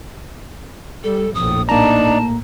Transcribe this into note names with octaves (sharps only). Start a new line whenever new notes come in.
G3 A4
A#1 F2 A2 D#6
A2 A#3 D4 D#4 D5 A5 A#5